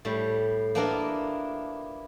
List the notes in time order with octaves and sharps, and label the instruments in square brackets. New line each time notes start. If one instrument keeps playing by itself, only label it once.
[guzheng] A2 G3
A#3 B3 D4 E4 F4 A#4